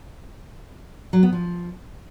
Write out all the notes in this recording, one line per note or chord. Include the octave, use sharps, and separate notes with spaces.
F#3
B3
F3